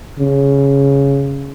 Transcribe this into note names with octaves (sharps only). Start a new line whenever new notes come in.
C#3